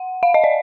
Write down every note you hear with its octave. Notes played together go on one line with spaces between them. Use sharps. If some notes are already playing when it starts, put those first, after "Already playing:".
Already playing: F#5
F5
D#5
D5